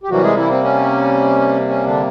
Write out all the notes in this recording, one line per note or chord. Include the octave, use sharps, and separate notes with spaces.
G4
C3 E3 F#3 G3 A#3 F#4
G#3 G#4
E3 E4
C4
C#4
C#4
D3 D4